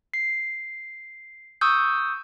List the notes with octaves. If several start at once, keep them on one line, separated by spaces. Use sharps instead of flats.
C7
C#6 D#6 E6 G6